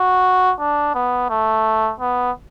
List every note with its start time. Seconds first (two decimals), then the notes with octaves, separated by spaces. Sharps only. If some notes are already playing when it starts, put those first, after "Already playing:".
Already playing: F#4
0.59 D4
0.95 B3
1.30 A3
2.00 B3